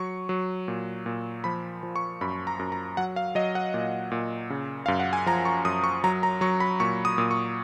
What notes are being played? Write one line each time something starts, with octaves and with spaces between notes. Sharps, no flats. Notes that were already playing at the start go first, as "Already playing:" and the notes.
Already playing: F#3 C#6
F#3
A#2
A#2
F3 B5
F3
C#6
F#2 B5
A#5
F#2
A#5
F#3 F#5
F5
F#3 D#5
F#5
A#2
A#2
C#3
F#2 F5
F#5
G#5
F3 A#5
C#6
F#2 D#6
C#6
F#3 A#5
A#5
F#3 C#6
B5
A#2 C#6
D#6
A#2
C#6